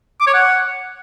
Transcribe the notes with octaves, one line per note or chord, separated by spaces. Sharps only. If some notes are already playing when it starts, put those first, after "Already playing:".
D6
C#5
F#5